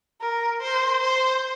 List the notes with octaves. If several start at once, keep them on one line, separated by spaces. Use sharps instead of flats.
A#4
C5
C5